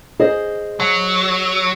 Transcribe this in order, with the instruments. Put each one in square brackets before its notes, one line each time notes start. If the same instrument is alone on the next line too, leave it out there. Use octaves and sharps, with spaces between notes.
[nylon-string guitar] G#4 C5 D#5
[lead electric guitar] F#3